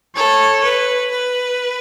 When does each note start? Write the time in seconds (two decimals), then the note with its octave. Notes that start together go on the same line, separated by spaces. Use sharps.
0.16 A4 C#5
0.64 B4
1.11 B4